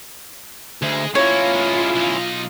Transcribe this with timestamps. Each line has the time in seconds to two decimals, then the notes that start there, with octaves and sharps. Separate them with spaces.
0.82 D2 G#3
1.15 A#3 C#4 E4 F4 C#5
1.55 G#3 A#4
1.96 B1 D#4